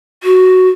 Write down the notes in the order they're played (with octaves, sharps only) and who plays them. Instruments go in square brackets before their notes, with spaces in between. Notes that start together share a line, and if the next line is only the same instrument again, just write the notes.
[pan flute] F#4